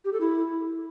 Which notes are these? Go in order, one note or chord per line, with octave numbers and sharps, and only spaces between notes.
G4
A4
E4